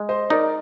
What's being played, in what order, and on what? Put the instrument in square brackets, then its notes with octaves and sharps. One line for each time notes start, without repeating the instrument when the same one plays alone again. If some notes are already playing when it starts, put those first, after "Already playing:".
Already playing: [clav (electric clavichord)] G#3
[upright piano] C5 D#5
[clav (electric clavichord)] D#4 [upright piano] A#4 D5